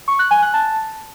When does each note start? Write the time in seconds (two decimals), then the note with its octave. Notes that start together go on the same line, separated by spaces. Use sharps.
0.08 C#6
0.19 F#6
0.31 G#5
0.42 F#6
0.54 A5